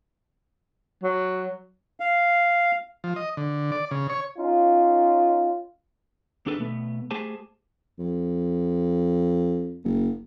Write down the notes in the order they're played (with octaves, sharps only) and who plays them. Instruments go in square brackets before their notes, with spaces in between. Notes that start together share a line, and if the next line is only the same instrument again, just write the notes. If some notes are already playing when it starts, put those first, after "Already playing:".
[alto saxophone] F#3
[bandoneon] F5
[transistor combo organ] F3
D#5
D3
D5
C#3
C#5
[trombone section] C#4 D#4 F4
[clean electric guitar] D#2 D4 G#4 A4 B4
B2 A3 B3
A3 G4 G#4 C5 G#5 A5
[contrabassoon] F2
F#1